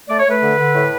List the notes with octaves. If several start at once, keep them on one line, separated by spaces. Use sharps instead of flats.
A3 D5
C#5
A3
B4
D3
D3
A2